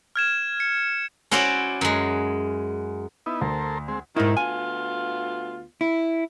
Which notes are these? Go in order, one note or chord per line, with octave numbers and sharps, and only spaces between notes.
F6 G#6 E7
C#7
C#4 E4 F#4 C5 D5
F#2 G#3
B3 D#4 E4
D2 A4 A#4 C5
G#3 C4
G#2 D#3 E4
D2 B3 F4 G#5
E4